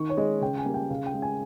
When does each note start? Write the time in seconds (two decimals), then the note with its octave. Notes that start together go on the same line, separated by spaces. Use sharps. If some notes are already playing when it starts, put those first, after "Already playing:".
Already playing: D#3 C#6
0.10 C#5
0.17 G#3 D#5
0.42 C#3 G5
0.58 G#5
0.65 G3 A#3
0.74 G5
0.90 C#3 F5
1.06 G5
1.14 G#3
1.22 G#5